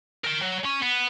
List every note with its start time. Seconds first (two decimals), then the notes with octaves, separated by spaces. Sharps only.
0.24 A#4 G5
0.41 F#3
0.64 C#4
0.82 B3